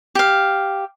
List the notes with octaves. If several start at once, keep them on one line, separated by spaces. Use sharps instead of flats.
G4 F5